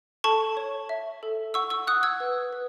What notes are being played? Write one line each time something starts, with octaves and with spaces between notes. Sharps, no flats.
A4 A5 C#6
C#5
E5
A4
F#5 C#6 E6
C#6 E6
F#5 D#6 F#6
E6 G#6
B4
B4